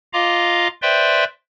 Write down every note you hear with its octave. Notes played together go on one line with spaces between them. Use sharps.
F4 D#5 F5 A#5 D6
B4 C5 D5 E5 G5 C6